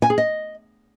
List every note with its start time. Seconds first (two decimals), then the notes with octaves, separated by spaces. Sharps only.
0.02 G#5
0.10 G#4
0.18 D#5